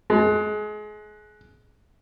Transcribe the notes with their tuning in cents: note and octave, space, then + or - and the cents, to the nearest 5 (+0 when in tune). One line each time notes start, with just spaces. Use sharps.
G#3 +30